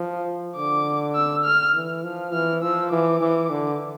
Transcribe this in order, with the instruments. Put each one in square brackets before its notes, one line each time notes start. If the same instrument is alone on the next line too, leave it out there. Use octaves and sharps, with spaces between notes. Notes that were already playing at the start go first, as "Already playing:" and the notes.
Already playing: [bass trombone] F3
[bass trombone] D3 [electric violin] D6
[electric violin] E6
F6
[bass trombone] E3
F3
[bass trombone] E3 [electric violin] F6
[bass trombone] F3 [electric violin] E6
[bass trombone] E3 [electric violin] D6
[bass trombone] E3
D3